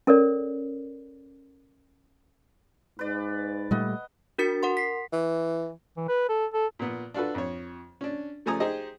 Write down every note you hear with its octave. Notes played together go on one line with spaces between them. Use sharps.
C#4 A4 A#4 C#5 D5
G#2 B4 D5
A#2 G3 A3 D#5 F#5
D4 F#4 A#4 A6 C#7
A#4 F#5 C6
B6 C7
E3
E3
B4
A4
A4
A#2 B3
D4 F4 F#4 A4 B4
F2 C#5
C#4 D4
C#3 F3 A3 G#5 A#5 D#6
D#4 G4 G#4 C5 D#5